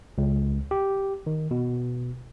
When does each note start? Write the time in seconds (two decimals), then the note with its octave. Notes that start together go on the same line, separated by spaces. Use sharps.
0.18 C#2
0.71 G4
1.26 D#3
1.51 B2